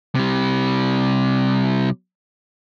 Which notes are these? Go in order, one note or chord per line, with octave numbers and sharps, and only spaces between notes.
C3 G3